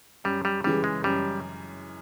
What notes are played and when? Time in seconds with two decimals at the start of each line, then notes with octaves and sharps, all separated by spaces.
0.24 F#2 G3
0.45 G3
0.64 C#3 E3 G3 G#3
0.84 G#3
1.04 F#2 G3